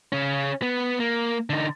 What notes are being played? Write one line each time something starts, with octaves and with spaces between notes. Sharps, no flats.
C#3 C#4
B3
A#3
D3 D#4